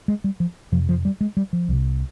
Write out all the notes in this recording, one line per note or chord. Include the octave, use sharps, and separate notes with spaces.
G#3
G3
F3
F2 C3 F3
F3
G3
G#3
G3
F3
C2 C3